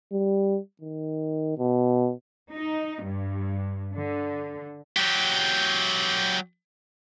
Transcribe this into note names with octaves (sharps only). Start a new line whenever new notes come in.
G3
D#3
B2
D#4
G2
D3
F#3 G4